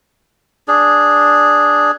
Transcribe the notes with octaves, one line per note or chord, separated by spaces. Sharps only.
D4 G#4